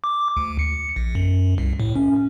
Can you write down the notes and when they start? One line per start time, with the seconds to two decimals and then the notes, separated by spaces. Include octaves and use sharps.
0.04 D6
0.37 D2
0.59 C#7
0.96 A#1
1.15 F#2
1.58 C2
1.80 A2
1.96 C#4